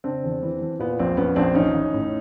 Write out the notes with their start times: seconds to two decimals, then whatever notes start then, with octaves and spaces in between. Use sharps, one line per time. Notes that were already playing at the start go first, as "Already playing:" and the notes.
0.04 C#3 C4 D4
0.24 E2
0.43 E3
0.61 E3
0.79 A#2 B3
0.99 A#1 C4
1.17 A#1 B3 C#4
1.36 A#1 C4 D4
1.55 A1 C#4 D#4
1.75 A1
1.93 A2